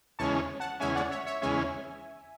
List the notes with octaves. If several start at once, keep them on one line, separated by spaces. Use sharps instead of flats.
E2 C#3 G#3 C#4 A5 C#6
F#5 A5
E2 C#3 G#3 C#4 E5 G#5
D5 F#5
C#5 E5
C#5 E5
E2 C#3 G#3 C#4 E5 G#5